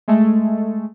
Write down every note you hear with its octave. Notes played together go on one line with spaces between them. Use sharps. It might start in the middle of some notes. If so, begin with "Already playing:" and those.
G#3 A3